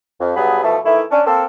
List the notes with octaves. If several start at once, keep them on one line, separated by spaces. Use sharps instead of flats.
F2
G2 F#3 G3 B3 G#4 B5
B2 E3 F3 A3
D#3 E3 A3 E4
C#4 D4
A#3 C4 A4